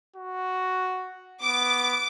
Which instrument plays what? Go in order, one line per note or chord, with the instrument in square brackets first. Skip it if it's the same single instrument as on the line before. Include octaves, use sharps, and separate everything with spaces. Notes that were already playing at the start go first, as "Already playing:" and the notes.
[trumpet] F#4
[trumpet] B3 [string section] D6